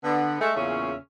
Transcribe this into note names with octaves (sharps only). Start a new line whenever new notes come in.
D3 B3
G#3 A3
E2 A#2 C#3 C#4 E5